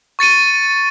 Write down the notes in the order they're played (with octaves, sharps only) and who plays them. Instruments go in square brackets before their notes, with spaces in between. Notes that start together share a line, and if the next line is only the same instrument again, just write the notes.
[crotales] C#6 A6 C#7 D#7